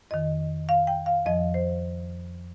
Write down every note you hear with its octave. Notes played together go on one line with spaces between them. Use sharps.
F2 D#3 D#5
F5
G5
F5
F2 F3 D#5
C5